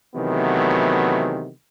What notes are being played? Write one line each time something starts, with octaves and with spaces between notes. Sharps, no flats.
C3 D#3 E3 F#3 A3 B3